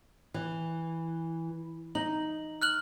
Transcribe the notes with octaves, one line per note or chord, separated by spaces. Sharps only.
E3
D#4 F#7
F6 F#6 F#7